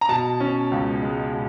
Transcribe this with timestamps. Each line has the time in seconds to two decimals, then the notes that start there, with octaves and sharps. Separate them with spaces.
0.01 A#5
0.09 B2 A5
0.40 C#4
0.72 C#2
1.02 G#3
1.34 B2